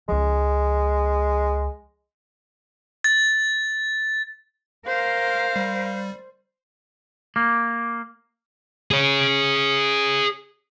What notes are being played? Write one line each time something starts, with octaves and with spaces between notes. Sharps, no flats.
C#2 F3 G#3
A6
A#4 C5 F5
G3
A#3
G#4 C#5